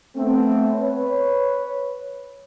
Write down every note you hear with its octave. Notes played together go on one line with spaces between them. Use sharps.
A3 B3 C4
B4 C#5